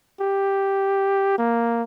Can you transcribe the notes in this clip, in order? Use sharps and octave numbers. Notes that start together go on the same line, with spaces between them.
G4
A#3